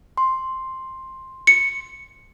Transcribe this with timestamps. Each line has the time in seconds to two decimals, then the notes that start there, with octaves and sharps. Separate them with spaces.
0.17 C6
1.47 C#7